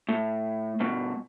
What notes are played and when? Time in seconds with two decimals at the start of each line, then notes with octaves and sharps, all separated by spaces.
0.09 A2
0.80 G2 B2